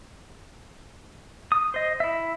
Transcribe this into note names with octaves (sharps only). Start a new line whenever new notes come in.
D#6
C5 D#5
E4 E5